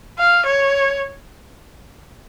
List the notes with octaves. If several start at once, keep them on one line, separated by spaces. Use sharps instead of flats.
F5
C#5